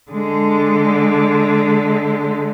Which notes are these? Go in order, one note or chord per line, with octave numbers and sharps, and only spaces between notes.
D3 G#3